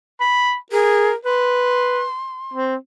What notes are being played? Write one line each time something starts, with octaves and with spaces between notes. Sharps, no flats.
B5
G#4 A#4
B4 C6
C4